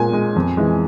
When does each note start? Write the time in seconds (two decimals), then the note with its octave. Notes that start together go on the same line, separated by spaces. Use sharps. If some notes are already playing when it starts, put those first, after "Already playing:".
Already playing: A#2 G#3 G#5
0.13 G#3
0.36 F2
0.57 E3 G#3